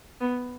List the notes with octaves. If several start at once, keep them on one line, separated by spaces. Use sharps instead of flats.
B3